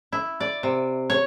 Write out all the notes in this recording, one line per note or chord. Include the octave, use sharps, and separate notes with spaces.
E4
D5
C3
C#5